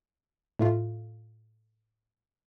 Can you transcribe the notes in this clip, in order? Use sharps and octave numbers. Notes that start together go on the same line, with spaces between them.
A2 A3 F4